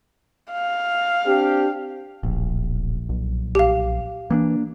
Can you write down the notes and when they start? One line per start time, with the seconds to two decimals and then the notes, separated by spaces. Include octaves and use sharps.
0.51 F5
1.26 C4 D4 G4
2.23 D1 A#1
3.09 B1
3.55 G4 F5
4.30 E3 A#3 B3 D4